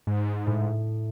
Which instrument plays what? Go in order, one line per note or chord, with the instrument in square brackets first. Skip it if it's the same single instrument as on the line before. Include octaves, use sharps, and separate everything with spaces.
[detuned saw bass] G#2
[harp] A2